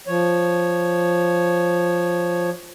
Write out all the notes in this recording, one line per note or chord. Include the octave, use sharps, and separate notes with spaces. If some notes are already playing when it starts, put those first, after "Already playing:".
F3 C#5